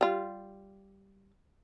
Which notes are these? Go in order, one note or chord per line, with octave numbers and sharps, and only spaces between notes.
G3 F4